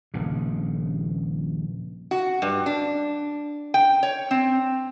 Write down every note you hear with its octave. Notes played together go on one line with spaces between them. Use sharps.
D#1 A#1 C#3
F#4
G2
D4
G5
C#5
C4